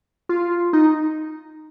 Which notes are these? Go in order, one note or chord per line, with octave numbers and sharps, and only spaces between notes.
F4
D#4